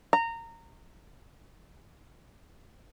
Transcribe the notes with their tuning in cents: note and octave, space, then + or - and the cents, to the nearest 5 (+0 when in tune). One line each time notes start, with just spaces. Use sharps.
A#5 -20